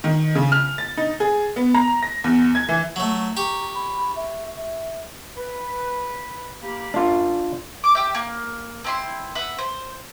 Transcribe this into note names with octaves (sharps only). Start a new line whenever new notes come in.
D#3
C#3
F6
A6
D#4
G#4
B3
A#5
A#6
E2
G#6
E3
F#3 A3
G4 A#5 C#6
B5
E5
E5
B4
A#3 G4 B5
F#2 G3 D4 F4
D6
G4 E5
A#3
C4 E4 C6
B4 E5 F#5
C5